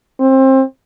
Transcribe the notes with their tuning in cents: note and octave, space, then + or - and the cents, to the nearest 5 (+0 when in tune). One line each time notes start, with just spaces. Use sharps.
C4 +25